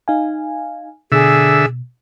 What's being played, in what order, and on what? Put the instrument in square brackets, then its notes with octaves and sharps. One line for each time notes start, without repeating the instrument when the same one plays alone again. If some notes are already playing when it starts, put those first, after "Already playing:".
[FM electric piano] D#4 F5 G#5
[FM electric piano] B2 [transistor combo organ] D3 E5 [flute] G#4